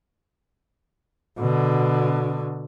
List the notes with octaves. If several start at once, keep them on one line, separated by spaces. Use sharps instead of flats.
B2 D3